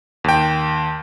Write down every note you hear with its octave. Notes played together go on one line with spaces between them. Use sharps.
D#2 G5